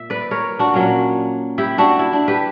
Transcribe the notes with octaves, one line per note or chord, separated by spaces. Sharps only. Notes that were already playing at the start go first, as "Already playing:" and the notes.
Already playing: A#2 E5
B4 D5
A#4 C#5
D4 F#4
A#2 F#3 A#3 C#4
E4 G4
D4 F#4
E4
D4
G4 B4